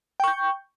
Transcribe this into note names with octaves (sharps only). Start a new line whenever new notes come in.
G5 C#6 G6